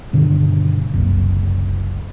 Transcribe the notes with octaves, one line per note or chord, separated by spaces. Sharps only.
G2 B2 D3 D#3
F#1 C2